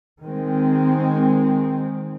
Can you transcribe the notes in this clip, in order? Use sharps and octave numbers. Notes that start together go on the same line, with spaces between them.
D#3 G#3 C4